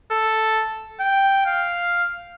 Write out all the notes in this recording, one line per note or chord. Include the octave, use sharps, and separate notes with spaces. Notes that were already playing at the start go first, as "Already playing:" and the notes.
A4
G5
F5